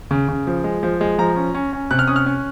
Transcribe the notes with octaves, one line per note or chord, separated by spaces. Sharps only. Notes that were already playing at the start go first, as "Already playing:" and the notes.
C#3
C#3
F3
G#3
F3
G#3
F3 A#5
C#4
C#4
C#4
C3 F#6
F6
C#4 D#6
F6
C#4